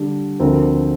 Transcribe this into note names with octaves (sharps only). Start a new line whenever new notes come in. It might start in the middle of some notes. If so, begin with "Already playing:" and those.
Already playing: D3 G3 D4
D2 D3 F3 C4 A#4